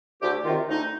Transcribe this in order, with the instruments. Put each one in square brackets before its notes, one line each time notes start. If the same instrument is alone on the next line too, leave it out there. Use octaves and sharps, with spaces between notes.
[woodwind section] D2 G4
D#3 F4
C3
D2 D#4